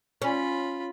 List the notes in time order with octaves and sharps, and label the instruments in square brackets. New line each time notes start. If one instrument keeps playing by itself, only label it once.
[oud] C#4 [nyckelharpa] F4 B5